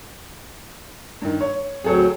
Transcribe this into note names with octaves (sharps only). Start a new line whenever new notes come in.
G2 D#3
C#5
D2 F#3 C4 G#4 A4 C#5